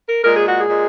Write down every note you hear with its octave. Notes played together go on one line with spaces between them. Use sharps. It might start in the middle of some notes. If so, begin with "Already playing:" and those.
A#4
A#2 G#3 A#4
G#4
F#4
G#4
A#2 G#3